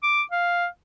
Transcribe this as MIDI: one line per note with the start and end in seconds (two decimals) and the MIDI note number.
0.03 0.22 86
0.32 0.66 77